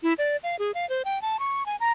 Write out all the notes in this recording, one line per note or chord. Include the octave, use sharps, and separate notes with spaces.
E4
D5
F5
G#4
F5
C5
G5
A5
C#6
G#5
A#5